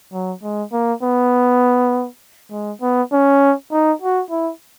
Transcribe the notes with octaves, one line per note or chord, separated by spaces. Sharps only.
F#3
G#3
A#3
B3
G#3
B3
C#4
D#4
F#4
E4